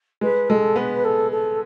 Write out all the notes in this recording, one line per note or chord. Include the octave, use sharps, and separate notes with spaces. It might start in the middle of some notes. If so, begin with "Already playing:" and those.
G#3 B4
G#3 A4
B3 B4
A4
A4